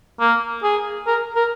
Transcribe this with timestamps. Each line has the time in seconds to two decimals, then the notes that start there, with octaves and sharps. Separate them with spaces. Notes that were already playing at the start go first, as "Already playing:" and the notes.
0.20 A#3
0.63 G#4
1.07 A#4
1.36 A#4